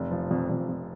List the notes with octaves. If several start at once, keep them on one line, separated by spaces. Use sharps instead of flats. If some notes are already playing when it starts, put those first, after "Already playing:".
Already playing: F1
F3
F2
F2
F2